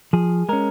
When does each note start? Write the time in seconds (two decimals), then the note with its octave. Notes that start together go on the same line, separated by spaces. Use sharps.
0.13 F3 G#4
0.49 G#3 C#4 A#4